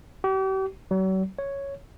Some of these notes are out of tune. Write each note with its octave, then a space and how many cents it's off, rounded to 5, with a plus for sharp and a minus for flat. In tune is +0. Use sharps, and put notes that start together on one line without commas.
G4 -40
F#3 +40
C#5 +0